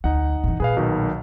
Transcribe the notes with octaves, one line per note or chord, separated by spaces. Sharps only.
D2 D#4 F#5
A2 E3
A#2 G#4 B4 F5
B1 B2 D#3